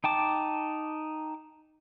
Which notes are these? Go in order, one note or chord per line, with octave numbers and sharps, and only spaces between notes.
D#4 G5 A5 D6